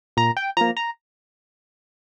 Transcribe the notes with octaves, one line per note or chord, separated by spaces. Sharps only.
A#2 A#5
G5
F3 A#3 A#5
A#5